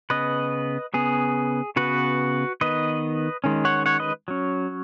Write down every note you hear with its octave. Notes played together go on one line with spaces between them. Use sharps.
C#3 B3 B4 D#5
C#3 B3 G#4
C#3 B3 F#4 B4
D#3 B3 B4 D#5
D#3 G#3 C#4
C#5 F#5
C#5 F#5
B4 D#5
F#3 C#4